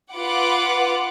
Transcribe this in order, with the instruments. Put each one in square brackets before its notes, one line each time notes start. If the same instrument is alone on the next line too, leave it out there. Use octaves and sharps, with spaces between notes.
[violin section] F4 B4 F#5 D6